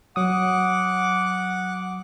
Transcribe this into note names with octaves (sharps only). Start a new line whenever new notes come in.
F#3 F#5 D6 D#6